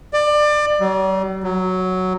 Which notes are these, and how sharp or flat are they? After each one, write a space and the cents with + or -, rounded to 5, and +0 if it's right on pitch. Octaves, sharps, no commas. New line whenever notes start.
D5 +25
G3 -45
F#3 +5